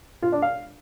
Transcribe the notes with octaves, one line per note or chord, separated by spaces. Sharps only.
F4
D4
F5